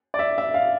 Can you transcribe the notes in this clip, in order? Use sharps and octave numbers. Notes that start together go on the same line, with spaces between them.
D5
E5
E5
F5